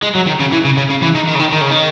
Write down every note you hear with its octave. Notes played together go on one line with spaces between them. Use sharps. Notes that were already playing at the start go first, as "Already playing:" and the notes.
G#3
F#3
D#3
C#3
E3
C#3
C#3
C#3
E3
D#3
D#3
C#3
D#3
D#3
C#3
D#3